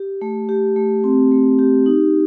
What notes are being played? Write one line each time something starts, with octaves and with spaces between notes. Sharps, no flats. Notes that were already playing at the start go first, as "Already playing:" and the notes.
Already playing: G4
A3
G4
A3
C4
A3
G4
D#4